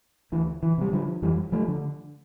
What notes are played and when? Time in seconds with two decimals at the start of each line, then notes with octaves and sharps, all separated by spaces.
0.32 D2 E3
0.63 E3
0.78 C3 G3
0.93 D3 F3
1.22 F2 E3 G3
1.52 F3 A3
1.68 D3